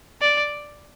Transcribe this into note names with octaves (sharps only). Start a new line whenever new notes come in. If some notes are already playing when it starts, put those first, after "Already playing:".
D5